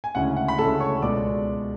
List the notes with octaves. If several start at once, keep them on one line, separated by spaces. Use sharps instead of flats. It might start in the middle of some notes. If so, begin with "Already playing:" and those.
G#5
D2 C#3 G#3 C#4 E4 F#5
F#5
B5
D2 C#3 G#3 C#4 E4 A4 A5
C#5 C#6
C#2 B2 G#3 D5 D6